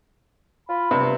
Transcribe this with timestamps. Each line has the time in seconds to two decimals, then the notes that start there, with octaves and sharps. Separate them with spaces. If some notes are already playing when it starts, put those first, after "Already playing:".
0.69 F4 B5
0.91 G2 C3